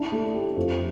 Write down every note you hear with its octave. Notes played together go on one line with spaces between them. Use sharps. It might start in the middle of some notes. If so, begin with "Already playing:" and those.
Already playing: D4 E4
A3
G4
F2